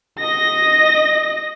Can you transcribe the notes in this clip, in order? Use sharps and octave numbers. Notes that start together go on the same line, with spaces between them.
D#5 A#6